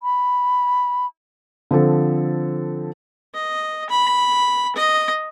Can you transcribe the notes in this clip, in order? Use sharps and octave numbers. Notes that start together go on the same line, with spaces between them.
B5
D3 F3 C4 A4
D#5
B5
D#5